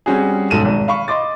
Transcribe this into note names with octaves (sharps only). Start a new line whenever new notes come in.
G3 C4 C#4 F#4 G#4
B1 G#2 A4 D#7 E7
G#1
F5 B5 C#6
D#5 C6 D6 A6